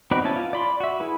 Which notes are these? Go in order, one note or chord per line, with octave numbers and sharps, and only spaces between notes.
C4 D#4 F#4 B4 D5
B3 C#4 E4 A5
F4
D5 B5 C6
F#4 E5
E4 G#4 B4